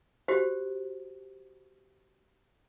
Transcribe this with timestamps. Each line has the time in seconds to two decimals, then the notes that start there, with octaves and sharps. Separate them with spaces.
0.28 F#4 G4 C5